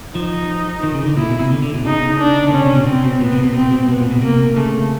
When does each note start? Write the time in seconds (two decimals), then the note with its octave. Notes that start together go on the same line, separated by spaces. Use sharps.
0.15 F3 D#4
0.83 D#3
0.95 C#3
1.06 D3
1.17 A#2 E4
1.29 B2
1.40 C3
1.51 D3
1.63 D3
1.74 B2
1.85 C#3 D#4
2.19 D4
2.48 D3
2.53 C#3 C#4
2.65 C3
2.76 B2
2.87 C3 C4
3.04 B2
3.21 A#2 B3
3.33 C3
3.44 C3
3.54 B2 C4
3.72 B2
3.88 B2 B3
4.00 A#2
4.11 B2
4.22 C3 A#3
4.56 C#3 A3